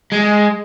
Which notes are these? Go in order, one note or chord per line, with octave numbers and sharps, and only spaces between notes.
G#3